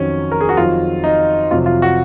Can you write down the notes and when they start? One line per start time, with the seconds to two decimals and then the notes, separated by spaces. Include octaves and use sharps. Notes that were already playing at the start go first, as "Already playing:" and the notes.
Already playing: F2 D#3 F#3 C#4
0.32 A#4
0.41 G#4
0.49 F#4
0.57 F2 D#3 F#3 F4
1.04 D#4
1.51 F2 C3 F#3 F4
1.66 F4
1.82 F#4